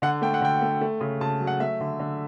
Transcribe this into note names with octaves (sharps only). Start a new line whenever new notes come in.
D3 F#5
A3 G5
F#5
D3 G5
A3
A3
C#3
C#3 A5
F#3
F#5
A3 E5
D3
D3